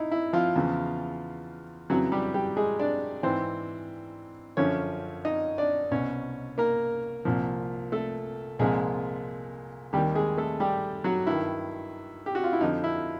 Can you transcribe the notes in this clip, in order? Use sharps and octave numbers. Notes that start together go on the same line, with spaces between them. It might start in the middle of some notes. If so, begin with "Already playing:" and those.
Already playing: D#4 E4
E4
F3 F4
E2 C#3 E3
F2 C#3 E3 F#3 F#4
G3 G4
G3 G4
G#3 G#4
D4 D5
G#2 E3 C4 C5
F#2 D3 F3 C#4 C#5
D#4 D#5
D4 D5
C2 B2 C#4 C#5
A#3 A#4
C2 A#2 F3
A3 A4
C2 A#2 F3 G#3 G#4
D#2 D#3 G3 G4
G#3 G#4
A3 A4
G3 G4
F#3 F#4
G2 D#3 E4
G4
F#4
F4
E4
F2 D3 F3 D#4
E4